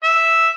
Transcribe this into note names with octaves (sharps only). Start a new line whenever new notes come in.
E5